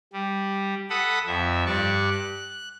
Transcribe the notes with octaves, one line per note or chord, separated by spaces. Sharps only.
G3
A4 F#5 B5 D#6
F2 E5
G2 D5 C#6
F#6